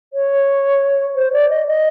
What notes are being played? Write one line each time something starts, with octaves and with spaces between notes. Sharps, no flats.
C#5
C5
D5
D#5
D#5